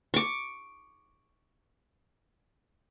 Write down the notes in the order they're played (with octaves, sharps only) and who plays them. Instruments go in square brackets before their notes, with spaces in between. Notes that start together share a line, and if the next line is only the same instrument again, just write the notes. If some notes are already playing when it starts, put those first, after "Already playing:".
[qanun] C#6 D6